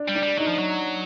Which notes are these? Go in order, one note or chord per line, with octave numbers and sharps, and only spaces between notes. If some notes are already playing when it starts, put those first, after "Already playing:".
Already playing: D4
G3
D4
G3
F#3 D#4
F3
F#3